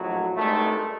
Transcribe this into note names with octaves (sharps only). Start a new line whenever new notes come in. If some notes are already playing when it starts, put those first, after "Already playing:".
Already playing: A#1 A2 F#3
G#1 G2 D#3 G#3 A3